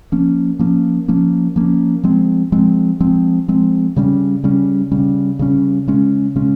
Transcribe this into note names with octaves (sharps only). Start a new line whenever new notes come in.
F3 A#3 C#4
F3 A#3 C#4
F3 A#3 C#4
F3 A#3 C#4
F3 G#3 C4
F3 G#3 C4
F3 G#3 C4
F3 G#3 C4
C#3 G3 C#4
C#3 G3 C#4
C#3 G3 C#4
C#3 G3 C#4
C#3 G#3 C#4
C#3 G#3 C#4